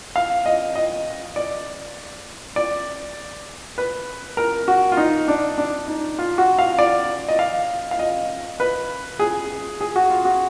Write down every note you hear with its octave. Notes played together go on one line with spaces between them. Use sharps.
F5
D#5
D#5
D5
D5
B4
A#4
F#4
F4
D#4
D4
D4
D#4
F4
F#4
F5
D5
D#5
F5
F5
D#5
B4
G#4
G#4
F#4
F4
F#4